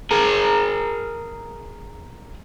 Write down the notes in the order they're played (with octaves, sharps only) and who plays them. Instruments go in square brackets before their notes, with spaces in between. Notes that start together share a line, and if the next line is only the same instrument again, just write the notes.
[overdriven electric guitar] G#4 A#4